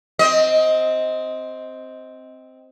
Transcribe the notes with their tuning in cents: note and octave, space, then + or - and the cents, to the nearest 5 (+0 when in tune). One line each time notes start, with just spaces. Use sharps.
C4 +0 D#5 +20